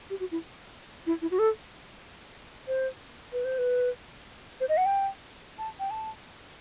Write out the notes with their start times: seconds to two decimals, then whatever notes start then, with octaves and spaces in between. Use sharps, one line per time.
0.10 G4
0.20 F#4
0.32 E4
1.07 E4
1.22 E4
1.31 F#4
1.39 A4
2.68 C5
3.33 B4
3.45 C5
3.58 B4
4.61 C5
4.69 D#5
4.77 F#5
4.86 G5
5.58 A5
5.80 G5
5.91 A5